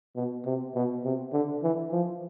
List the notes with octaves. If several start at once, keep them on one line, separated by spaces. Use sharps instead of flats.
B2
C3
B2
C3
D3
E3
F3